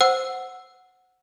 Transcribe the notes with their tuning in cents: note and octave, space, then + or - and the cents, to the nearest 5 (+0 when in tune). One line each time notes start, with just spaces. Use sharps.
C5 +0 F#5 +0 E6 +0